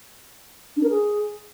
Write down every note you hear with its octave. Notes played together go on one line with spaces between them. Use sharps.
D4
A#4
G#4